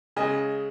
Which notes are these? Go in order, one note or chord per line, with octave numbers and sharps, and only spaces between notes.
C#3 G#3 D#5 G#5